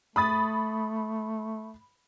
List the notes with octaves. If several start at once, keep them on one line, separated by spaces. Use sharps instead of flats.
A3 B5 D#6 A6